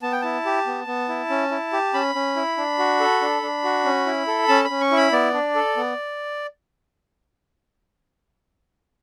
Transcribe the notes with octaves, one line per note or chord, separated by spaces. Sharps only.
B3 A5
G5
E4 A5
G4
B3
B3
E4
C#4
E4
G4
C#4 B5
C#4
E4
D4
F#4
A4
D4
D4
F#4
C#4
E4
A4
C#4 A5
B5
C#4
C#6
E4
B5
B3 D5
D4
A4
B3